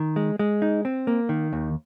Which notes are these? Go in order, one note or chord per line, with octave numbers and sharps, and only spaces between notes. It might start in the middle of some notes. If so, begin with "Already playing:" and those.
Already playing: D#3
G#3
G#3
D#4
C4
A#3
D#3
D#2